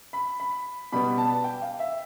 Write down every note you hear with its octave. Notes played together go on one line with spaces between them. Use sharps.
B5
B5
B2 G3 B3 B5
A5
G5
F5
E5